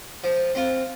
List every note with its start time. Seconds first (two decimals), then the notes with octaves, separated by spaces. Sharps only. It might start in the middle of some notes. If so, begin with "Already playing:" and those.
0.24 F3
0.55 C4 F4